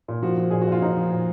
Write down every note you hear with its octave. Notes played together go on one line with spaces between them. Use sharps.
A#2
F3 F#4
F3
A#2 G#4
F#4
A#2 F4
F3 D#4
F3
A#2